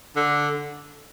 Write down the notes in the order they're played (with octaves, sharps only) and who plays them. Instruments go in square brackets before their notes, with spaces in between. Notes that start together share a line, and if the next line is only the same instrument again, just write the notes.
[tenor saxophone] D3